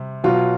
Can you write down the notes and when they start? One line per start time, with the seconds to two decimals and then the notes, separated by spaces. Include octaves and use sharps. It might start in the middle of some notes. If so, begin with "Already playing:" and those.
Already playing: C3 G3
0.24 B2 F#3 F4